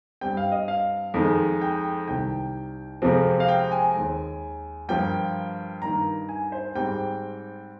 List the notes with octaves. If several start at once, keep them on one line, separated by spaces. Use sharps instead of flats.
G2 G3 C4 G5
F5
D#5
F5
F2 D#3 G#3
G5
C2 C3 D#3 G5
F2 C3 F3 G#3 C4
F5
G5
G#5
D#2 D#3 G#3
G2 F3 A#3 G5
G2 D#3 A#3 A#5
G#5
C5
G#2 G3 C4 G5